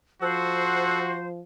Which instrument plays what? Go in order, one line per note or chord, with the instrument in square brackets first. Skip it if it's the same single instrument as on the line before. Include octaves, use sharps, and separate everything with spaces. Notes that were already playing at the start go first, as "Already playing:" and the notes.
[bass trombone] F3 [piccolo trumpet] F#4 [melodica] A4 F#5 [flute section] C5